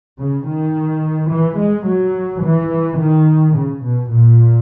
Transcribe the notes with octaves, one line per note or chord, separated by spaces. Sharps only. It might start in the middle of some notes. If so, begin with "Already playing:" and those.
C#3
D#3
E3
G#3
F#3
E3
D#3
C#3
B2
A#2